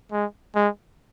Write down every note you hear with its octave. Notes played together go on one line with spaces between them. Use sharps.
G#3
G#3